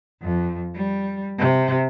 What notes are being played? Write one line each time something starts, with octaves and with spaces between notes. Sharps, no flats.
F2
G3
C3